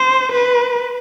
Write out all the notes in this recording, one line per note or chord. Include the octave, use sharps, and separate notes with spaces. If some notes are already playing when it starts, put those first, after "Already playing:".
Already playing: C5
B4